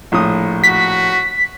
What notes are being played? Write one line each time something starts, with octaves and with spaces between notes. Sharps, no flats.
A#1 A2 D#6
F#4 B6